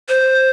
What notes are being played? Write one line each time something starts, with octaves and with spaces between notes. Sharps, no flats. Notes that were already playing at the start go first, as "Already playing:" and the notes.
C5